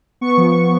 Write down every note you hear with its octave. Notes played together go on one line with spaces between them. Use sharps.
B3 C#6
F3